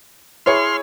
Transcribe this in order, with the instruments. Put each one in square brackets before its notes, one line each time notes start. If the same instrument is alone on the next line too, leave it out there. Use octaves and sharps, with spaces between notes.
[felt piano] E4 G#4 C#5 [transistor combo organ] C6 F6